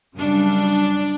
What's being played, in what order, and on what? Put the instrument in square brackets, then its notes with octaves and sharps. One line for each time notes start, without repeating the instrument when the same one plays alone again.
[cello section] F#2 C#3 G3 D4